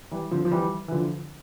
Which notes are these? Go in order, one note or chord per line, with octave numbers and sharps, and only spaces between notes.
E3 G3
D3 F3
F3
E3 G3
E3
D3 F3